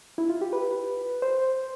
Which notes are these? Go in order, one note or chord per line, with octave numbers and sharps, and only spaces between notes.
E4
F4
G4
B4
C5